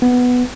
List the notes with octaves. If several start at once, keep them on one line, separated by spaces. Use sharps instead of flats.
B3